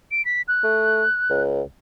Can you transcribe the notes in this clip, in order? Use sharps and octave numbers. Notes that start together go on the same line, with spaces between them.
D7
B6
F#6
A3
C#2